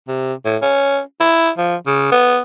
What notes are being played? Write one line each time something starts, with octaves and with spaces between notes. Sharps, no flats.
C3
A2
C#4
E4
F3
C#3
B3